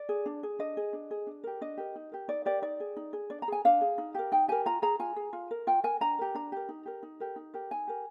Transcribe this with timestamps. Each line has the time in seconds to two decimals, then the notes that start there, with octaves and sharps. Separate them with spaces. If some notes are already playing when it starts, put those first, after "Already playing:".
Already playing: D5
0.09 G#4
0.26 D4
0.43 G#4
0.59 D4 D#5
0.77 G#4
0.93 D4
1.11 G#4
1.27 D4
1.44 G4 A#4
1.61 D4 D#5
1.77 G4 A#4
1.96 D#4
2.12 G4 A#4
2.28 D#4 D5
2.45 G4 A#4 D5
2.62 D#4 D5
2.80 G#4
2.97 D#4
3.13 G#4
3.30 D4 D5
3.42 A#5
3.48 G#4 G#5
3.65 D4 F5
3.81 G#4
3.98 D#4
4.15 G4 A#4
4.32 D#4 G5
4.48 G4 A#4 G#5
4.66 F4 A#5
4.82 G#4 A#5
4.99 F4 G#5
5.16 G#4
5.33 F4
5.51 A#4
5.67 F4 G5
5.84 A#4 G#5
6.01 D4 A#5
6.19 G4 A#4
6.35 D4 A#5
6.52 G4 A#4
6.69 D#4
6.86 G4 A#4
7.03 D#4
7.20 G4 A#4
7.36 D#4
7.54 G4 A#4
7.71 D#4 G#5
7.87 G4 A#4